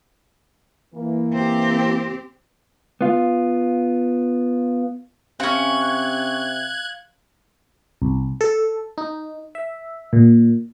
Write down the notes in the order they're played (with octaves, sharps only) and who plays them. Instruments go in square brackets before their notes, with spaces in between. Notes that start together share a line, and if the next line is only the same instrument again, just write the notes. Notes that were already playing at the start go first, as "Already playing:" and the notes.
[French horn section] E3 A#3
[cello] C4 G4
[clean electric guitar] B3 F4
[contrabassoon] C3 [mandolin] C4 C#4 [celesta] F5 C#7 [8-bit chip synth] F#6 G#6
[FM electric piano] C2
A4
D#4
E5
A#2